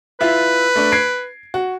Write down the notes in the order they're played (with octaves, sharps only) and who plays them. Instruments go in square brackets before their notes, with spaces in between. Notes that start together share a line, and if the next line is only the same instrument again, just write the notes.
[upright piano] E4 F4 E5 [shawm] B4
[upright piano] A3 D4
G#6 C7 D7
F#4